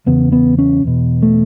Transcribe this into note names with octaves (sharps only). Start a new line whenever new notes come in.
E2 C#3 B3
B3
C#4
E2 B2
A3